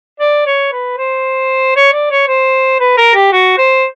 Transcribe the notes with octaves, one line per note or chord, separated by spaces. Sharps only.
D5
C#5
B4
C5
C#5
D5
C#5
C5
B4
A#4
G4
F#4
C5